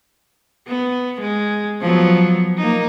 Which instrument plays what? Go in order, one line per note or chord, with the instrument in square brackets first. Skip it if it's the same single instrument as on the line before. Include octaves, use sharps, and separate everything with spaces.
[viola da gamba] B3
G#3
F3 F#3 B3
A#3 D#4